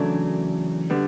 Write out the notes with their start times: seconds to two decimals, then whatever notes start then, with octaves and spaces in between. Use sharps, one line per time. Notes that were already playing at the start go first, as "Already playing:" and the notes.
Already playing: E2 C#3 F#3 A3 D4
0.90 D3 G3 B3